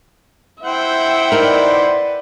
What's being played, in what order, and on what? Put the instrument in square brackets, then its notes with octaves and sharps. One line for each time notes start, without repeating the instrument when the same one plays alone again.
[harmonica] E4 C5 F#5 [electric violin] E5 G5
[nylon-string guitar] D#4 A#4 [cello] B4 D5